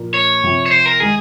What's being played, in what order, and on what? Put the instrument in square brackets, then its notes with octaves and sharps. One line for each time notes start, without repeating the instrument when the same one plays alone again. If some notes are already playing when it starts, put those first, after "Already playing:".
Already playing: [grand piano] A#2 F3 A#3
[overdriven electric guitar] C#5
[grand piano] C3 F3 C4
[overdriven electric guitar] C#5
C5
A#4
[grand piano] D#3 G#3 [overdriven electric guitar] G#4